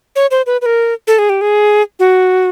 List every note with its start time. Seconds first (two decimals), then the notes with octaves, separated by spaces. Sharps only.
0.16 C#5
0.31 C5
0.46 B4
0.62 B4
0.66 A#4
1.07 A4
1.19 G#4
1.29 G4
1.41 G#4
1.99 F#4